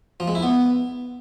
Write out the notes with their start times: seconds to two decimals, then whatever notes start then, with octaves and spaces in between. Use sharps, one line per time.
0.20 F3
0.28 G#3
0.35 E4
0.43 B3